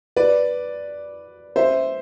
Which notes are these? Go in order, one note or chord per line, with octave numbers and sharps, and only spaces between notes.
B4 D5
C5 E5